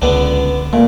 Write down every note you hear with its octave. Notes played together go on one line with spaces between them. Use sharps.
C#2 D3 B3 D4
A#2 A3